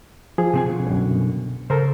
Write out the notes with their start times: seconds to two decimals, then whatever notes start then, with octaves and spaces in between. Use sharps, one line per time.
0.38 F3 G#4
0.53 C3 C4 G#5
0.66 B2 D3
0.86 C2 F#2
1.70 C#3 A4 A#4 C5